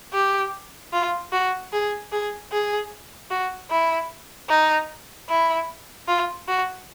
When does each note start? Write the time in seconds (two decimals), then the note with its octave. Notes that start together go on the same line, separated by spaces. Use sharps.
0.13 G4
0.93 F4
1.32 F#4
1.72 G#4
2.12 G#4
2.52 G#4
3.30 F#4
3.70 E4
4.49 D#4
5.29 E4
6.08 F4
6.48 F#4